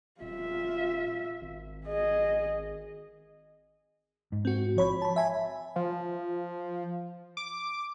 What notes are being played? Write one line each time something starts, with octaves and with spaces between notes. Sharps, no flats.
D#1 F4 E5
G#1
G#4 D#5
G#2
C4 F#4
A1 F3 C#5 B5
A5 B5
E5 G#5 B5
F3
D6